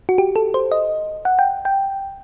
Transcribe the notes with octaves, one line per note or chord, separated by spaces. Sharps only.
F#4
G4
A4
C5
D#5
F#5
G5
G5